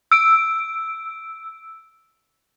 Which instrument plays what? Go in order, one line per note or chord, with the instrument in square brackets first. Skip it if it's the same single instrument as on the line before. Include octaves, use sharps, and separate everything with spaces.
[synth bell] E6 D7